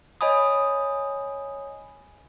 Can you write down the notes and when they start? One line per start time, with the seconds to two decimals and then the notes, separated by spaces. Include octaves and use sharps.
0.21 C#5 D#5 G#5 B5 D#6